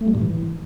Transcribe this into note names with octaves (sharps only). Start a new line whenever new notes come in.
A3
G3
A2
E3